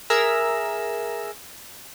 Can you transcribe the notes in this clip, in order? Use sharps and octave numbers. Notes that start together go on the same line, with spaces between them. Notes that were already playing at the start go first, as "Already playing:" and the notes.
G#4 A#4 E5 A#5 E6